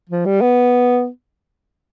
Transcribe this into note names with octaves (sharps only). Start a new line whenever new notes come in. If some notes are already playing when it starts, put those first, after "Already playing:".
F3
G3
B3